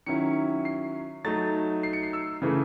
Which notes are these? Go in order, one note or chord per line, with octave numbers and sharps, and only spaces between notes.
D#3 F#3 C#4 E4 C#7
C7
F#3 A3 D#4 A6
C7
C#7
C7
E6
C#3 E3 A3